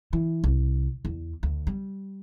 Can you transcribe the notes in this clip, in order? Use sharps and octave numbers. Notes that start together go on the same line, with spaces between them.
E3
C2
E2
D2
G3